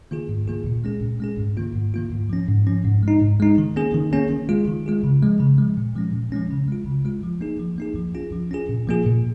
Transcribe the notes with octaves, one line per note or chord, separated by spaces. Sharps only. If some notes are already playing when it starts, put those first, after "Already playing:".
D#3 A#3 F4 G#4
G#2
D#3 A#3 F4 G#4
A#2
G#3 C#4 G#4
A#2
G#3 C#4 G#4
G#2
D#3 A#3 F4
G#2
D#3 A#3 F4
G#2
F3 C#4
G#2
F3 C#4
G#2
G#3 D#4
G#2
G#3 D#4
D#3
A#3 C#4 G#4
D#3
A#3 C#4 G#4
D#3
G#3 F4 G#4
D#3
G#3 F4 G#4
C#3
F3 G#3
C#3
F3 G#3
A#2
F3 G#3 C#4
A#2
F3 G#3 C#4
C#3
G#3 F4
C#3
G#3 F4
F3
A#3 D#4 G#4
F3
A#3 D#4 G#4
F3
C#4 F4 G#4
F3
C#4 F4 G#4
A#2
F3 A#3 F4 G#4
A#2